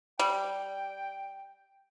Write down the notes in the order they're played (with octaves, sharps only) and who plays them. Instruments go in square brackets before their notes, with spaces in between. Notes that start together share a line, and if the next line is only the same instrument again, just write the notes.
[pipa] G3 [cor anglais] G5